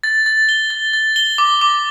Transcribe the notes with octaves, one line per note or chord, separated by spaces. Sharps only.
A6
A6
G7
A6
A6
G7
D6
D6